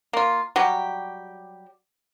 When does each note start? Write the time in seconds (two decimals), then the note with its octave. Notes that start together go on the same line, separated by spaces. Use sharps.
0.13 A#3 F4
0.56 F#3 G3 G4